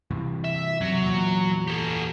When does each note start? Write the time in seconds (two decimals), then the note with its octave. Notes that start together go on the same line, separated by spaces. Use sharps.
0.11 G2 C3 E3
0.45 E5
0.81 C3 F#3
1.01 E2 A#2
1.67 G4 A4